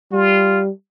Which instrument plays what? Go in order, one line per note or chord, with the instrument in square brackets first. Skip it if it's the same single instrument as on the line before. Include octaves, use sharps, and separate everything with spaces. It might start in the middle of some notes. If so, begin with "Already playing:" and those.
[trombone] G3 [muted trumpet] F4